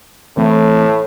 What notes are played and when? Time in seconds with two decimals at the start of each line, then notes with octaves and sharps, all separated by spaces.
0.37 A2 E3 A3 C4